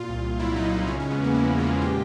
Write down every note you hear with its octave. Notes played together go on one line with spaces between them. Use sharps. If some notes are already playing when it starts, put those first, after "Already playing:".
Already playing: A#2 F4
C2
C2
F#3 E4
A#2 D#4
C2 D#4
C#3 C#4
G#3 C#4
B3
E2
A#3
F3 E4
C#3
F4
G#3
A#2 G4